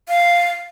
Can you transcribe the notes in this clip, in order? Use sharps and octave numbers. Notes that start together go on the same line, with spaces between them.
F5